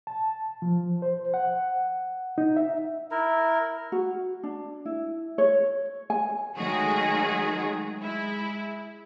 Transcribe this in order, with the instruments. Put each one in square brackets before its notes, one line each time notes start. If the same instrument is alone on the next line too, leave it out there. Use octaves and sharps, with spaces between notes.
[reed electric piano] A5
F3
C5
F#5
D#4
E5
[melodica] E4 A#4
[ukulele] F#4
D4
E4
C#5
G#5
[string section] D#3 F#3 G#3 A3 F#4 G#4
G#3 E4